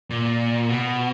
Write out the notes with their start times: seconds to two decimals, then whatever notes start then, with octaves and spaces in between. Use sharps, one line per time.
0.10 A#2
0.69 B2